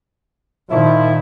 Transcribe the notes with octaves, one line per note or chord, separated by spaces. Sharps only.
A#2 D#3 F3 E4